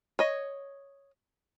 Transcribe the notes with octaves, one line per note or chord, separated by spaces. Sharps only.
C#5 D#5